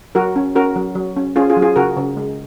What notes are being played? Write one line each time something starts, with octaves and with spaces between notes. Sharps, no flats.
F#3 F#4 A#4
C#4
C#4 F#4 A#4
F#3
F#3
C#4
C#4 F4 G#4
F4 G#4
F#3
F4 G#4
C#3 F#4 A#4
C#3
G#3